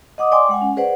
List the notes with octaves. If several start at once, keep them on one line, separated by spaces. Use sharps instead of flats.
D#5 F#5 D6 D#6
D5 G5 G#5 C6 D6
G#3 F#5 G#5
C#4
G#4 B4 C5 D5 F#5